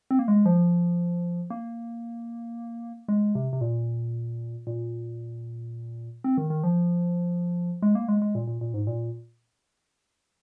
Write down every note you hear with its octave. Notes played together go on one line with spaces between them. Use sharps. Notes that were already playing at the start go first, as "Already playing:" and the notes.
C4
A#3
G#3
F3
A#3
G#3
C3
C3
A#2
A#2
C4
D#3
D#3
F3
G#3
A#3
G#3
G#3
A#2
A#2
A#2
G#2
A#2